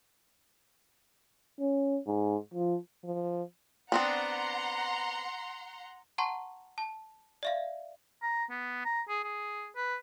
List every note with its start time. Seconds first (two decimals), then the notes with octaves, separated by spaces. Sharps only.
1.60 C#4
2.07 G#2
2.54 F3
3.04 F3
3.92 B3 C4 D4 F#5 A#5 C6
6.18 F#5 A5 A#5 C6 C#6
6.78 A5
7.43 D5 E5 F5
8.22 A#5
8.50 B3
8.85 A#5
9.09 G#4
9.24 G#4
9.76 B4